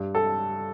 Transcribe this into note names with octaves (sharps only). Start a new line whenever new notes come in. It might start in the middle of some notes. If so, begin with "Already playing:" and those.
Already playing: G2
A4